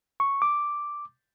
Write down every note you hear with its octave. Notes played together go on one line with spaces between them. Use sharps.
C#6
D6